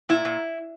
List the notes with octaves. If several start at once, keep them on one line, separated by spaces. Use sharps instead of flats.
A#2 E4
A#2